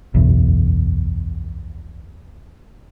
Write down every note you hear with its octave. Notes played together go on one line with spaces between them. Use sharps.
F#1 B1 E2